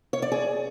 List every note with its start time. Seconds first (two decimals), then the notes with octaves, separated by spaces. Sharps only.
0.13 C#5
0.22 D5
0.32 G#4